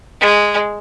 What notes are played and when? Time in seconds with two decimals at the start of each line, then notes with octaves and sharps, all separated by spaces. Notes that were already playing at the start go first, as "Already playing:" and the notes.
0.21 G#3